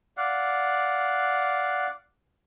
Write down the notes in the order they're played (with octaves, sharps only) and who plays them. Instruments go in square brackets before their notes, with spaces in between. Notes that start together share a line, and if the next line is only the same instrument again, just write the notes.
[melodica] D5 F5 F#5